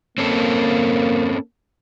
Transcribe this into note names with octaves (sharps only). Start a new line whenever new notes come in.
A#3 C4 C#4 A4